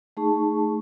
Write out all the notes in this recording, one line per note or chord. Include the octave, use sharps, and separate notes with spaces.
A3 D#4 G#4 A5 C#6